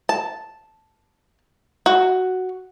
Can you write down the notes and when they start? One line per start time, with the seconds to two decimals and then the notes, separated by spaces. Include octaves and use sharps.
0.09 A5
1.86 F#4